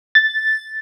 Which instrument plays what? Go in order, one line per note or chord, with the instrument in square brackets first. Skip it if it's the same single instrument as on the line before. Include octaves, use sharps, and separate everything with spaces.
[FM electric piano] A6